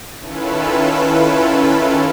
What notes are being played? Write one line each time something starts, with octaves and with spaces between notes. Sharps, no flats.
D#3 C#4 E4 F4 A4 B4